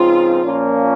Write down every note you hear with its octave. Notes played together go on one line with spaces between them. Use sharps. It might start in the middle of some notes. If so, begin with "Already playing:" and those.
Already playing: C#2 C#3 F3 C4 D#4 F4
A#2 F3 A#3 C#4